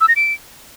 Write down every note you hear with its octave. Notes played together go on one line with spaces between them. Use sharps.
E6
A#6
D7